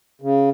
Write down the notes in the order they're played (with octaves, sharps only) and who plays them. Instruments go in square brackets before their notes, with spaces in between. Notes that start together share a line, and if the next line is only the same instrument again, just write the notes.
[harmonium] C#3